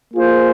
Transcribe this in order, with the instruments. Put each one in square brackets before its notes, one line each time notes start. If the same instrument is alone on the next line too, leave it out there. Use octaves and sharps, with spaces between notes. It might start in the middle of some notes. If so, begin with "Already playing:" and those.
[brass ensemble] A#3 F4 G#4 C5